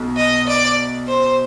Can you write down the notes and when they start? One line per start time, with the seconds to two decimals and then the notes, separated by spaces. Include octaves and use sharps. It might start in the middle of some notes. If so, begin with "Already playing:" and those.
Already playing: B1 B2
0.17 D#5
0.47 D5
1.08 C5